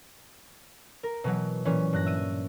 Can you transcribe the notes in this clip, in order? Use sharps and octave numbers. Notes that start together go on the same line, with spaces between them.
A#4
B2 E3 F#3
A#2 E3 C#4
G2 F#6 A#6
E5 D#7